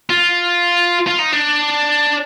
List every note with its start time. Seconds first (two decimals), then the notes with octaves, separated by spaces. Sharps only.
0.10 F4
1.07 F4
1.19 D#4
1.33 D4